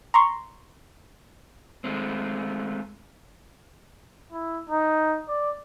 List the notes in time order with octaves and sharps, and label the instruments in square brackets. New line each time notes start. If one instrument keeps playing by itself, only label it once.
[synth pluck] A#5 C6 C#6
[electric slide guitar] G#3 A3 C4
[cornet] E4
D#4
D5